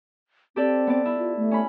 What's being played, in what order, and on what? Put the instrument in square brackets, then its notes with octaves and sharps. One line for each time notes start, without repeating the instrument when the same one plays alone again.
[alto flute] C4 [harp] G4 A4 D5
[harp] B3 D5
[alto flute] B3 [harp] E4
[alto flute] F4
A3
[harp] C#4 B5